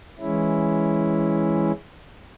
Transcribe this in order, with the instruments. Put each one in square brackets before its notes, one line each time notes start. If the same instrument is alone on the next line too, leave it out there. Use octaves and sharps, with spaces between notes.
[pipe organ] E3 G#3 C#4 E4